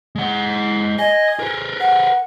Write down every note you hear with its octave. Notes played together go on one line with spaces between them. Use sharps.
G#3 F#5
D#5 G#5
A#4 B4
F#5